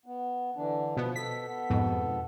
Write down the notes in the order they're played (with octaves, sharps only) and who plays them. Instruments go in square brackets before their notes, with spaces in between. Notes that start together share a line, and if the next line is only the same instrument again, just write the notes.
[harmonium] B3
D3 E3 D4
[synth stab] B2 B3 [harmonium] F3
[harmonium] B2 A4 [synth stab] B6
[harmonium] B3 A4
[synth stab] F2 G#2 B2